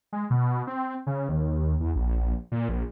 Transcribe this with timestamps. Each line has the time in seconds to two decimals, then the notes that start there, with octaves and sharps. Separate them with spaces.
0.13 G#3
0.30 B2
0.67 C4
1.07 C#3
1.29 D#2
1.80 E2
1.96 A#1
2.52 A#2
2.69 A#1